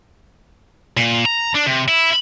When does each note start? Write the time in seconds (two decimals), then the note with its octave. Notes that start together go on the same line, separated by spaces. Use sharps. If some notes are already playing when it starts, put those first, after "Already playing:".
0.97 A#2
1.25 A#5
1.55 D4
1.67 C3
1.88 E4